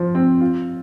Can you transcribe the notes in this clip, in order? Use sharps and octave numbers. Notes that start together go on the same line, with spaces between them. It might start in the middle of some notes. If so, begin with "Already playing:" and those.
Already playing: F3
C4
F4